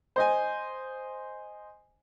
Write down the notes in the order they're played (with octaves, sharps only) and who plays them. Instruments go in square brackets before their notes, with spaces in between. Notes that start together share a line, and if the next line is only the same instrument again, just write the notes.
[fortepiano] C5 D#5 G#5